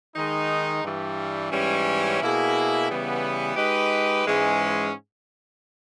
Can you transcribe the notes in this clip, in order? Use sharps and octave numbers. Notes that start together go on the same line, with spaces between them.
D#3 G#3 D#4
G2 E3 G3
G#2 E3 G3 C#4
B2 A#3 E4 G#4
C#3 E3 G3 B3
G#3 D#4 G4 B4
G#2 E3 G#3 C#4 G#4